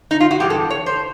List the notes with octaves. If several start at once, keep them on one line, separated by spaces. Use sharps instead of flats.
D#4
F4
F#4
G2 E3 G#3 B3 G4
A4
C#5
C5